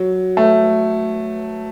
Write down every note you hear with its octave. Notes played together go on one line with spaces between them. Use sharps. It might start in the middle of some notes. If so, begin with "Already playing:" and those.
Already playing: F#3
A3